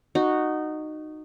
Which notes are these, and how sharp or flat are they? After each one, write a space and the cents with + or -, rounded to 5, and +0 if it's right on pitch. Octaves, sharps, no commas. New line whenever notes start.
D#4 -15 F#4 +0